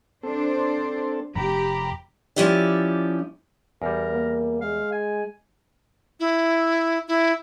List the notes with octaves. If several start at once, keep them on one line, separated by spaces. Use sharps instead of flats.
C4 D4 A4 C5
F1 G4 A#5 B5
F3 C#4 E4 G4 D5
E2 G3 A#4
A#3
G#3 F5
G#5
E4
E4